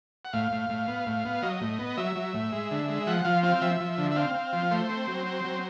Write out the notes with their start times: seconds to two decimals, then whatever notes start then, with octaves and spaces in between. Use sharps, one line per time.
0.25 F#5
0.33 A2 F5
0.52 A2
0.69 A2
0.88 B3
1.06 A2
1.25 B3
1.43 F#3 D#5
1.61 A2
1.79 B3
1.97 F#3 E5
2.16 F#3
2.34 A2
2.52 G#3
2.71 D3
2.88 G#3
3.07 F3 F#5
3.25 F3 F5
3.43 C4 F5
3.61 F3 E5
3.80 F3
3.98 D3
4.11 E5
4.16 C4 F5
4.35 C4
4.53 F3
4.71 A3 C5
4.89 C4
5.07 F#3
5.26 C4
5.44 F#3